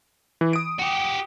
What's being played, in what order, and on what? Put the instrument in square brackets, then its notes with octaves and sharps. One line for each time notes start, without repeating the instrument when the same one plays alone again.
[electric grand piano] E3
D#6 D7
[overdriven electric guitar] F#4 G4